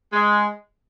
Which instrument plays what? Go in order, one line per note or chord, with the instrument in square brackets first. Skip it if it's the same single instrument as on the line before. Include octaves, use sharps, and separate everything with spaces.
[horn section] G#3